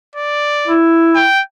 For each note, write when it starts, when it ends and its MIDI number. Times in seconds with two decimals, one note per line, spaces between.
0.16 0.79 74
0.67 1.24 64
1.15 1.41 79